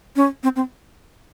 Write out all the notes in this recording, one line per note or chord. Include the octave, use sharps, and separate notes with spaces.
C#4
C4
C4